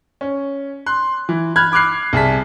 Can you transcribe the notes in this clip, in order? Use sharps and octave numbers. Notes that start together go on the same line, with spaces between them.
C#4
C6 F#6
E3
B5 F6 F#6 G#6
B5 D6 F6 F#6 C7
C2 G#4 A5 B6